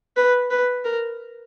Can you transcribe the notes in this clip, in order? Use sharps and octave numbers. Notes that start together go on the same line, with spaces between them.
B4
B4
A#4